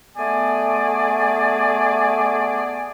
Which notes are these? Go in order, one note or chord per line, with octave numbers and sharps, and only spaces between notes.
A3 B3 G#4 D5 G#5